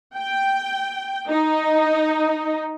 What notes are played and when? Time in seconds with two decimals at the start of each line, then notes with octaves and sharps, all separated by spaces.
0.16 G5
1.29 D#4